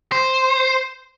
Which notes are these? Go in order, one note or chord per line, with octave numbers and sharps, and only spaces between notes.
C5